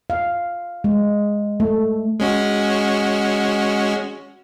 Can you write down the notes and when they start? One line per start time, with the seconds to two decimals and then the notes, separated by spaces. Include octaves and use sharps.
0.10 F5
0.84 G#3
1.60 A3
2.20 G#3 C#4 F#4